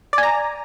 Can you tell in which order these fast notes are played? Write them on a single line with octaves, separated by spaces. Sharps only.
D5 G#5 A#5